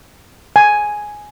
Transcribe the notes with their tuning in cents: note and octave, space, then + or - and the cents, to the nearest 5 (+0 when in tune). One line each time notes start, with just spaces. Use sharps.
G#5 +5